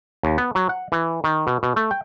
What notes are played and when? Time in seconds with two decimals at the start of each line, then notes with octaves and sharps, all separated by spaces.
0.23 D#2
0.38 B3
0.55 F#3
0.69 F#5
0.92 E3
1.24 D#3
1.47 B2
1.63 B2
1.76 A3
1.91 G5